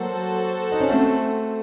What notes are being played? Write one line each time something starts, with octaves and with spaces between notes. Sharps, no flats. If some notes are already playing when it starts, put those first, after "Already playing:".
Already playing: F#3 A#3 F#4 A4 C5 F#5
D#4
C#4
A3 C4